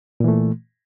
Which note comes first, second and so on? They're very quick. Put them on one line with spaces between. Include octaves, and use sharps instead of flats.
A#2 E3 A3